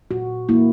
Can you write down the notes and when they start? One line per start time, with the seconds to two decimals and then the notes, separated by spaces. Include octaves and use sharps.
0.11 A#2 F#4
0.49 A#3 E4